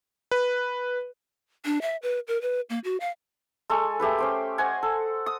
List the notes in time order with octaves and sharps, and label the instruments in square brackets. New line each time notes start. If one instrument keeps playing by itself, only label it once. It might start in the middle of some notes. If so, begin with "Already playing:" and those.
[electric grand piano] B4
[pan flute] D4
E5
B4
A#4
B4
A#3
F#4
F5
[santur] G#3 A4 G#5 C#6
A3 G4 G#4 B4
C#4 C5 G5
C5 D#5 F#5 G#5
A4
D#6